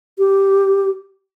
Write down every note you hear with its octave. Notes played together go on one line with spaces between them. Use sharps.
G4